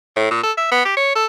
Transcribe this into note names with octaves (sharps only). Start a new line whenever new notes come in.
A2
A#2
A4
E5
B3
G4
C#5
A4